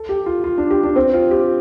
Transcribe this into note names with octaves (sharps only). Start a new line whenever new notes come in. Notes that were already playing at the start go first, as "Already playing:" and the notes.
Already playing: A4
G4
F4
F4
D4
G4
D4
C4
F4
G4